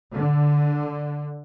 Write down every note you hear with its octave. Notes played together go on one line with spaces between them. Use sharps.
D3